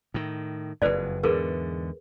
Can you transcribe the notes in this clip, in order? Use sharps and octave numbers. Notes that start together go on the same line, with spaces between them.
A2 D#3
F#1 F2 B4 C5 D5
E2 G#2 D3 G#4 A#4 B4